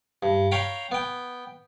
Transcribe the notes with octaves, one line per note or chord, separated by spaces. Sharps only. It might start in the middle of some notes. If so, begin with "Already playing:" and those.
G2
C#5 F5 G5 A#5 B5
B3 G5